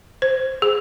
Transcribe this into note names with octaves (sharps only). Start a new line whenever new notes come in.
C5
G#4